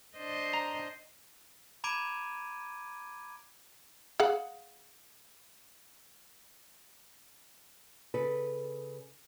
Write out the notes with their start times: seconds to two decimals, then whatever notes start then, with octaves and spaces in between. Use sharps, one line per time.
0.18 D4 C5 D#5
0.53 A#5
1.84 A#5 B5 D6 G#6 D7 D#7
4.20 G#4 F5 F#5
8.14 C#3 A4 B4